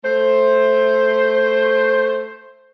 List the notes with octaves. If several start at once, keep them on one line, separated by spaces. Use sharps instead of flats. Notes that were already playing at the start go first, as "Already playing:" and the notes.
A3 C5